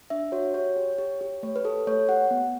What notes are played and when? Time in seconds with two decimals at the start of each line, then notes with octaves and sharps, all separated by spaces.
0.10 D4 E5
0.32 F#4 C#5
0.54 G4 C#5
0.76 G4
0.98 G4
1.21 G4
1.43 A3 C#5
1.56 B4
1.64 G4 A4
1.87 A3 C#5
2.09 G4 F#5
2.31 B3